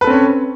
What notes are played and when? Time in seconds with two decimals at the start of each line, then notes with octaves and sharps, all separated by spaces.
0.01 B4
0.04 A4
0.07 C4
0.10 C#4
0.13 C#5